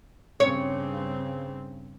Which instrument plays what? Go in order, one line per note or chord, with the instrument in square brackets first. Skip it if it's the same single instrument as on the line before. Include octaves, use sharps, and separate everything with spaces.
[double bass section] G2 C#3 C4 [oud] C#5